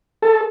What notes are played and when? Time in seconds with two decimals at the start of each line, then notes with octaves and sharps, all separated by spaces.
0.22 A4